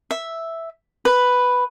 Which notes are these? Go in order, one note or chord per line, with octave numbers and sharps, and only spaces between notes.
E5
B4